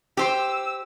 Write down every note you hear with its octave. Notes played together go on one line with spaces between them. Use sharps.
G4 C5 E6